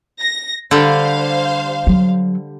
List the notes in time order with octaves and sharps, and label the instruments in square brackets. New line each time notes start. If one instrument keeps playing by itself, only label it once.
[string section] A#6
[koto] D3 G3 [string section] C5 F5
[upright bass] F#3